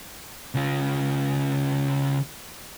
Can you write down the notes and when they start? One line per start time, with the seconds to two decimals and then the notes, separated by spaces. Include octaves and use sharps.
0.55 C#3 F4